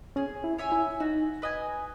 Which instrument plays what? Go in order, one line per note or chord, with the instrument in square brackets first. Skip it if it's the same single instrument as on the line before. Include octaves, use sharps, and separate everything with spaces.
[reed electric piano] C#4 [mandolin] G#4
[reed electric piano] E4
[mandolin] C#5 E5 G#5
[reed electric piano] E4
[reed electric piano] D#4 [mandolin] F#4
[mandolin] B4 D#5 G#5